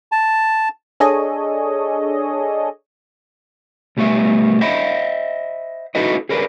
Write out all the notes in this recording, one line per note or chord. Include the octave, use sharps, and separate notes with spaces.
A5
D4 G#4 A4 C#5 D#5
B1 G3 A3 B3 E5
C5 D#5 E5 F#5 B5
D#4 E4 F#4 A4 B4 D#5
G#4 A#4 B4 D5